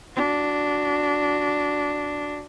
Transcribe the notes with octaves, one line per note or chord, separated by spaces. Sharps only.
D4 F#4